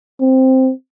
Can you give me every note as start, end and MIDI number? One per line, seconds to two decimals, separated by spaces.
0.21 0.71 60